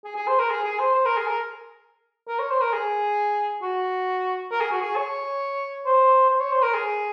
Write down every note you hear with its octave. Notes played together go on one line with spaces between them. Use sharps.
G#4
G#4
C5
A#4
G#4
G#4
C5
C5
A#4
G#4
A#4
A#4
C#5
C5
A#4
G#4
F#4
A#4
G#4
F#4
G#4
C#5
C5
C5
C#5
C5
A#4
G#4